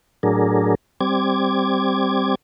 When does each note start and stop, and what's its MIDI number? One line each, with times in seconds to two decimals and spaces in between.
0.23 0.75 45
0.23 0.75 54
0.23 0.75 62
0.23 0.75 68
0.23 0.75 70
1.01 2.35 55
1.01 2.35 60
1.01 2.35 86
1.01 2.35 92